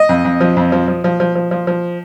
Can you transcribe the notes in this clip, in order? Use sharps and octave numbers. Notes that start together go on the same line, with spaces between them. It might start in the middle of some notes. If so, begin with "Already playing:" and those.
Already playing: D#5
F2
F2
F3
F2
F3
F3
F3
F3
F3
F3
F3